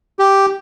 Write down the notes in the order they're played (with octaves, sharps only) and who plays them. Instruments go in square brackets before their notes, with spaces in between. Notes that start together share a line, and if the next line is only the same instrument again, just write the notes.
[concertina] G4